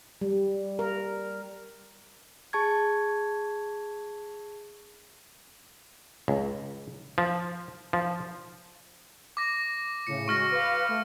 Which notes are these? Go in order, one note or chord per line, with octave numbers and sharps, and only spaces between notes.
G3
A#4
G#4 A5 C#6 G#6
C#2
F3
F3
D6 A#6
A2 C#3 C#7
G#3 F#4 C#6 F6 A#6
B4 F5
A3